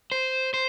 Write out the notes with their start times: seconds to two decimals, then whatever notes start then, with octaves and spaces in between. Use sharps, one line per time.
0.12 C5
0.54 C5